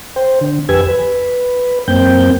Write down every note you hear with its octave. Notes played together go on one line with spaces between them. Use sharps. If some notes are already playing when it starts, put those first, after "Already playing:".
C5 G5
D3
F2 G4 B4 G#5 E6 G#6
B4
F#2 A#3 C4 G5 G6